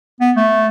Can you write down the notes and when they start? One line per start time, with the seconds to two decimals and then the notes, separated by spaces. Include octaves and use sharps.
0.21 B3
0.36 A3